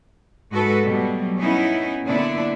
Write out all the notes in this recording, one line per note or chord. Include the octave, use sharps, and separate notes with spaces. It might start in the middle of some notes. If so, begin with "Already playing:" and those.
G#2 G#3 F#4 A4 B4
B2 F#3 G3 A3
B3 C#4 D#4 E4
A#2 D3 B3 D4 E4